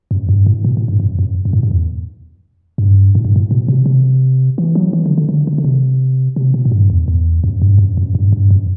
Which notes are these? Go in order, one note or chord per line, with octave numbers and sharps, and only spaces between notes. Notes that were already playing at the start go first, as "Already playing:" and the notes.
F#2
G2
A2
B2
A2
G2
F#2
F#2
F#2
A2
G2
E2
G2
A2
G2
A2
B2
C3
C3
E3
F#3
E3
D3
D3
D3
D3
D3
C3
C3
B2
A2
G2
E2
E2
F#2
G2
F#2
F#2
G2
G2
F#2